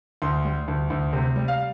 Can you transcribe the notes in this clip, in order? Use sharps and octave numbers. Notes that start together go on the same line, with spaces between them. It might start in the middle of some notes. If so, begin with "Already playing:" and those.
D2 C6
G3
D2
D2
C3
G3
F5